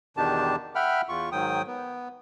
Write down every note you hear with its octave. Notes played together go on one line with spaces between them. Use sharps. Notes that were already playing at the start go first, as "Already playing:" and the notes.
E2 B2 D#3 D4 G4 A5
E5 F#5 G5 B5 F6
E2 F4 C#6
G#2 D#3 F#3 G5 D#6
B3